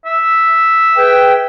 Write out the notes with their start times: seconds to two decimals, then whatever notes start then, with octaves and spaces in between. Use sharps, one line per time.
0.05 E5
0.96 G#4 B4 G5